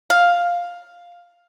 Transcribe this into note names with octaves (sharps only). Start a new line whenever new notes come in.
F5